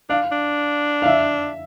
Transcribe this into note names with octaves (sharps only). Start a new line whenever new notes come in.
D4 F5
D4
F5
E5